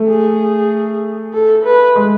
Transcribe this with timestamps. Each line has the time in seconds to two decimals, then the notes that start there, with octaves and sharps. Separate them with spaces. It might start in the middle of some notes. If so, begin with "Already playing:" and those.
Already playing: A3
0.08 G#4
1.34 A4
1.65 B4
1.96 G#3